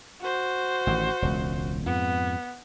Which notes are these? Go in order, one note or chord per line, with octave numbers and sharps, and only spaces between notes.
F#4 C5
A1 D#3
E1 C#2
F2 G#2 B3